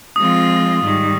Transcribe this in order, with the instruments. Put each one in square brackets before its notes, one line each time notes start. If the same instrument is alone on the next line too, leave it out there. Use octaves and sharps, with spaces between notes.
[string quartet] F3 G#3 C4 F4 [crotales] D#6
[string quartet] G#2 D#3 G3